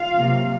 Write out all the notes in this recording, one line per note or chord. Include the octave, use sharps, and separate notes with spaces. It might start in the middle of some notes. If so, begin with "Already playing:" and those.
Already playing: F4 F5
C3 F#3 A#3